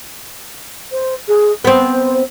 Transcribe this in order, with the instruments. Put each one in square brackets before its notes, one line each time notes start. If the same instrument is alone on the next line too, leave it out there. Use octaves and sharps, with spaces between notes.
[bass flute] C5
G#4
[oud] B3 C4 [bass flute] C5